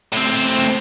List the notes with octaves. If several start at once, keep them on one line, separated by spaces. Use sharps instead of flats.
A2 C4